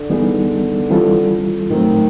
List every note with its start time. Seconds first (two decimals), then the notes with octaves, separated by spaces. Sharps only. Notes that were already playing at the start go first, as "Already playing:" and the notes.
Already playing: D3
0.10 E3 G3 B3 D#4 G#4
0.91 E3 G3 C4 F4 A4
1.70 A2 D#3 F#3 A3 C4